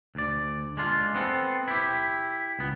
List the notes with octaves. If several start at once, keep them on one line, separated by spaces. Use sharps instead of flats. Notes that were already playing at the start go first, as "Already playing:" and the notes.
D2 D5
G#3 D4 F4
B3 C4 A4
E4 G4
C#2 B3